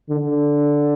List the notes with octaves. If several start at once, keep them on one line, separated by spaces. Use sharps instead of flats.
D3